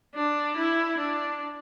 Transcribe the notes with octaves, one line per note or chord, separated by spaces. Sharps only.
D4
E4
D4